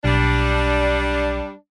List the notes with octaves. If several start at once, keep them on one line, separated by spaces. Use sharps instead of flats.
B1 G3 D4